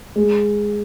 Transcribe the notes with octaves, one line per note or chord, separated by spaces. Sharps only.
G#3